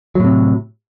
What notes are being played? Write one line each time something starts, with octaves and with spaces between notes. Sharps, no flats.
A2 C3 F#3